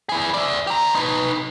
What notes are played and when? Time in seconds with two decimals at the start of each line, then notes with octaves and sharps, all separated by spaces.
0.09 E4 G#4
0.34 D5 E5
0.67 G4 A#5
0.95 D#4 B4